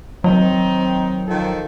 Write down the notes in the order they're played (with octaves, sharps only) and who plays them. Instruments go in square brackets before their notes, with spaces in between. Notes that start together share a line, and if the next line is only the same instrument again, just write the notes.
[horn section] D#3 C4 D#4 [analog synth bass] F#3
[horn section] D#3 F3 A4